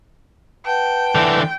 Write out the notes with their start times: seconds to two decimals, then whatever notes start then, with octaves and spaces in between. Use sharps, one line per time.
0.66 B4 F#5 G5 A5
1.15 D3 E3